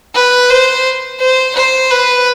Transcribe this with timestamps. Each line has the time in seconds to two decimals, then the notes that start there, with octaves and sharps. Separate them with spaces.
0.14 B4
0.50 C5
1.20 C5
1.55 C5
1.90 B4